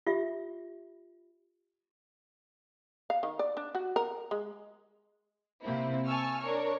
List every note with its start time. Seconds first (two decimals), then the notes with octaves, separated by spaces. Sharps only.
0.07 F4 G4 E5
3.10 F5
3.23 D#3
3.39 D5
3.57 D4
3.75 F#4
3.96 A#4
4.31 G#3
5.63 C3 A#3 C4 E4
6.06 G#5 A5 C#6 E6 F6
6.40 D4 A#4 C#5 C#6